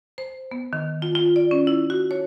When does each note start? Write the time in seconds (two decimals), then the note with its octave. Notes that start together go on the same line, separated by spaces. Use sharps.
0.18 C5
0.51 B3
0.73 D#3
1.02 F4
1.15 F4
1.36 D5
1.51 C#4
1.67 E4
1.90 F#4
2.11 C#5